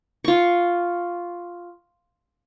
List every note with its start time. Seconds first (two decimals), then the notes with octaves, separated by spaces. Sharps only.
0.25 F4 C#6